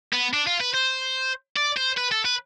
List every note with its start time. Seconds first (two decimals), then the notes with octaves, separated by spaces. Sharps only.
0.13 B3
0.33 D4
0.47 F4
0.61 B4
0.74 C5
1.57 D5
1.77 C5
1.98 B4
2.12 A4
2.25 B4